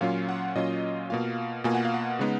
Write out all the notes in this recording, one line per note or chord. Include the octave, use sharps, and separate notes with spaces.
A#2 F#3 C#4 F4 F5
F#5
A#2 F#3 C#4 F4 D#5
B2 A#3 F4 F5
B2 A#3 F4 G#5
F#5
F5
F#5
C#3 G#3 B3 D#4